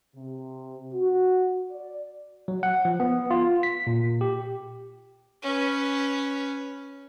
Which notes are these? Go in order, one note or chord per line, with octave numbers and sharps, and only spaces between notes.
C3
F#4
D5
F#3
F#5
F3
B3
F4
B6
A#2
G4
C#4 B4